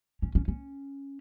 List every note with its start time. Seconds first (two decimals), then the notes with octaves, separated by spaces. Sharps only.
0.22 C#4
0.35 C#4
0.48 C#4